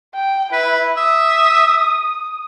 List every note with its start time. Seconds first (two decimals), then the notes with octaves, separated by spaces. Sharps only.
0.15 G5
0.53 E4 B4
0.97 E5 D#6